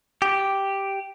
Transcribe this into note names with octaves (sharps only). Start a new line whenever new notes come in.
G4